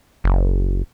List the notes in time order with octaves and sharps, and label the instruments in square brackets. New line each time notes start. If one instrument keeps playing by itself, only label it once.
[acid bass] F#1